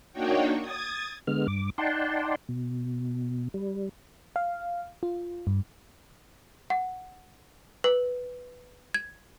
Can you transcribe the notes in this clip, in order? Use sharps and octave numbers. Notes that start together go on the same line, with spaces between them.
A#3 D4 D#4 F#4 C#5 G5
D#6 G#6 A6
D3 G#3 B3 F6
G2 D6
D#4 D5 F#5 G5 A5 C6
B2
G3
F5
F4
G2
F#5
B4
G#6